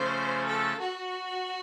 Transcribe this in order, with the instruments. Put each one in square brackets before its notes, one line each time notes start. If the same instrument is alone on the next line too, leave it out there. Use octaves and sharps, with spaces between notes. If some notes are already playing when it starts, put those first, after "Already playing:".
Already playing: [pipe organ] C#3 F3 A3 C#4 [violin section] C5
[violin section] A4
F#4